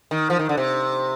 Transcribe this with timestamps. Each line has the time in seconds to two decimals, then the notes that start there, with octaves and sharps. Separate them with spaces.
0.11 D#3
0.30 F3
0.39 D#3
0.49 D3
0.57 C3